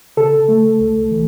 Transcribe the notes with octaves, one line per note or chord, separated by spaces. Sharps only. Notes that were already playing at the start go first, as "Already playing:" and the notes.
C#3 A4
A3
C#2
E3